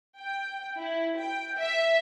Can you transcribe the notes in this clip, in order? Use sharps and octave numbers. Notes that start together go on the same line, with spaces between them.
G5
E4
G5
E5